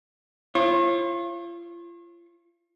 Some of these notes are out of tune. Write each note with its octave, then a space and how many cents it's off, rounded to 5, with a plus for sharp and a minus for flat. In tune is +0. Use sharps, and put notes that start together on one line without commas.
F4 -35 C#5 -45